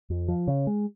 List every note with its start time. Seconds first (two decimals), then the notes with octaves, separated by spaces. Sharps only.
0.10 F2
0.28 F3
0.47 C#3
0.67 G#3